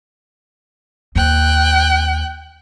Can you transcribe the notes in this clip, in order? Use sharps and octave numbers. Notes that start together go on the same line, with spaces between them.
D#2 G5 F#6